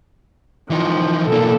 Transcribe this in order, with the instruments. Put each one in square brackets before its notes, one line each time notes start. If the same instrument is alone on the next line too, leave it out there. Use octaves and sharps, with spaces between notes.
[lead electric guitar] E3 D#4 [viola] F3
[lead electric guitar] B1 A#3 [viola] A4